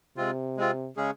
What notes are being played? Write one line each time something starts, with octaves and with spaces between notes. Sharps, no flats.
C3 G#3 C4 F4
G#3 C4 F4
C#3 G#3 C#4 G#4